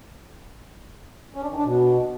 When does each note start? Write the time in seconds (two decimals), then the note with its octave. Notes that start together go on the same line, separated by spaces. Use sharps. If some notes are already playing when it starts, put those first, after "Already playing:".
1.34 C#4
1.42 D4
1.49 D#3
1.57 D4
1.64 B2